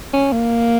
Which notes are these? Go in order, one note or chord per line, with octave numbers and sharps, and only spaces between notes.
C#4
A#3